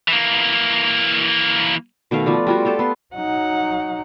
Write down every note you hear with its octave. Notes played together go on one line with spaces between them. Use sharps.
E3 A#3
B2 D#3 A3 F5
F3 B3 D5
G3 F4 F#4
F4 G4 A4 C5
B3 C6
F#3 D#4 F#5